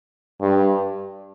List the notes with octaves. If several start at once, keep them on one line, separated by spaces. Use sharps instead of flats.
G2